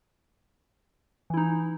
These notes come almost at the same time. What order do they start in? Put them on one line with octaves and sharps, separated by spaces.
E3 E4 D#4